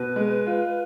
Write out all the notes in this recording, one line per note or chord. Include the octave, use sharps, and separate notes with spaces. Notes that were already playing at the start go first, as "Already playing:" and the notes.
Already playing: B2 B4
G#3
F4